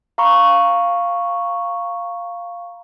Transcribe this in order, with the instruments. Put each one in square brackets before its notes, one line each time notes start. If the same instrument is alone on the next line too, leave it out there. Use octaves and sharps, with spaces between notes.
[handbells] F5 A#5 B5 C#6